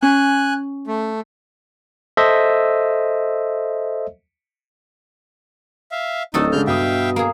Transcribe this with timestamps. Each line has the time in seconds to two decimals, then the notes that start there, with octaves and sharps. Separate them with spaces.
0.03 C#4 G#5 F#6
0.87 A3
2.17 A4 C5 D#5 E5
5.91 E5 F5
6.34 D1 D#4 F#4 A4 D#5
6.52 C#3 G#3 D4 F6 G6
6.67 G2 B2 E5 F5 G5 D#6
7.16 A#3 G#4